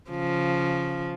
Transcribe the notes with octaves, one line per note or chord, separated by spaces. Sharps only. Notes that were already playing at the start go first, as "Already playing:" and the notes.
C#3 F3